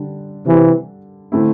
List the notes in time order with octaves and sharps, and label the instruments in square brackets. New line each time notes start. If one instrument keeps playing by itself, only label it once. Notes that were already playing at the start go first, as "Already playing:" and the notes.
Already playing: [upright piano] D3 G3 D4
[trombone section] C3 E3
[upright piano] D3 A3 C4 E4